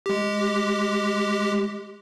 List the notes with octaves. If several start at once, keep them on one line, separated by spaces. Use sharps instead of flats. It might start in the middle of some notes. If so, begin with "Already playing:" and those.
G#3 G4